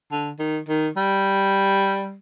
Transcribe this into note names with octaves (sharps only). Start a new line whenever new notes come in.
D3
D#3
D#3
G3